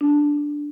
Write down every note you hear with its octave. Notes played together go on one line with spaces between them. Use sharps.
D4